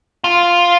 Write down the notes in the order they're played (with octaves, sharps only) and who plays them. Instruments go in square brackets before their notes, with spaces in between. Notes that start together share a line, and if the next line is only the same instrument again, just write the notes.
[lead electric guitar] F4